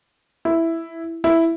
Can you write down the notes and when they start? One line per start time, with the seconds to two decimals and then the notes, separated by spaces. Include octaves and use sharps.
0.45 E4
1.24 E4